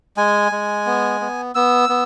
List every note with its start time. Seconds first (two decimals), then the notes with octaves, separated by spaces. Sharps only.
0.17 G#3 G#5
0.52 G#3
0.86 B3
1.21 B3
1.55 B3 E6
1.89 B3